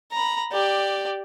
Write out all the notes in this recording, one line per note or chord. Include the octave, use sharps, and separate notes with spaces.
A#5 B5
G4 D5